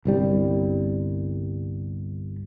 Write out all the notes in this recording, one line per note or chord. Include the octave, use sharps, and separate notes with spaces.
G1 C2 G3